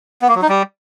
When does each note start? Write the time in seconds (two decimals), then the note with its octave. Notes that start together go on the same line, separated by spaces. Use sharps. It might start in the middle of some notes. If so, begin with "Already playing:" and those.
0.22 B3
0.28 A#3
0.35 F#3
0.42 D#4
0.49 G3